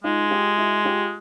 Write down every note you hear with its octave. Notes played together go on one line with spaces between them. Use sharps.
G#3 D#4 F4
F4 G4
E4 F#4
F4 G4